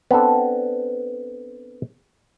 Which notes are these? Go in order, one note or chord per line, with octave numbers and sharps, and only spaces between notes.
B3 C4 D4 A4